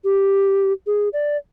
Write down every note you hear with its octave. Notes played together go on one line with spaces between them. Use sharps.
G4
G#4
D5